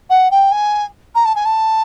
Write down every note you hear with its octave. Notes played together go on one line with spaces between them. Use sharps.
F#5
G5
G#5
A#5
A5
G#5
A5